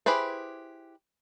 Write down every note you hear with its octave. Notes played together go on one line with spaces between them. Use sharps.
E4 G4 G#4 B4 C5